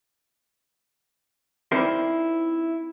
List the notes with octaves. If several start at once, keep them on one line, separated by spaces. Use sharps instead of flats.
C4 D#4 E4 A#4 C5 D5